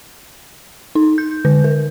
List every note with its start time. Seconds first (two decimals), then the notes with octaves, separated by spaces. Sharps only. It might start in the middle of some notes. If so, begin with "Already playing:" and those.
0.95 D#4
1.18 G6
1.45 D3
1.64 A#4